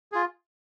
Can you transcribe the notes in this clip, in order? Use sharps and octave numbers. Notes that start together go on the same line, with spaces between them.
F4 G#4